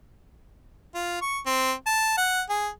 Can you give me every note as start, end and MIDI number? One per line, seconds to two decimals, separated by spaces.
0.95 1.21 65
1.22 1.39 85
1.46 1.72 60
1.86 2.14 81
2.17 2.42 78
2.49 2.69 68